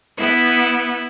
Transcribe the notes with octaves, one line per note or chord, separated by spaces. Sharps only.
B3 E4